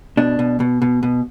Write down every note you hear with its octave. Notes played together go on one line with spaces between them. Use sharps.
B2 D4
B2
B2
B2
B2